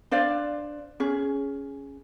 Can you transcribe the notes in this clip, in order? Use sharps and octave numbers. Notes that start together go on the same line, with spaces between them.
D4 C5 D5 F5
C#4 G#4